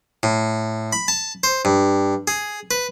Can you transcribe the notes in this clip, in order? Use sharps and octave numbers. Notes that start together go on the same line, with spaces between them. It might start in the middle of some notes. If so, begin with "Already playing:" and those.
A2
B5
A5
C5
G2
G#4
B4